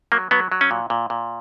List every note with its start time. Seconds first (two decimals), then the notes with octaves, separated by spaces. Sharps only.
0.12 F#3 A#3
0.31 F#3 B3
0.52 F#3
0.61 C#4
0.71 A#2
0.90 A#2
1.10 A#2